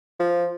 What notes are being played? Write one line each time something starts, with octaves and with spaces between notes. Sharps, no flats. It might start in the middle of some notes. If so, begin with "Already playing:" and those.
F3